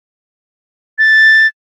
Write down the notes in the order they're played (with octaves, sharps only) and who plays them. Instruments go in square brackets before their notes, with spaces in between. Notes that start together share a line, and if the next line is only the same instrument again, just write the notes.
[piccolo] A6